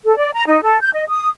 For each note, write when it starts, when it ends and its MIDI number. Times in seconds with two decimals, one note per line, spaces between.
0.05 0.15 69
0.17 0.30 74
0.34 0.44 82
0.47 0.60 63
0.63 0.78 69
0.81 0.90 91
0.93 1.04 75
1.08 1.28 87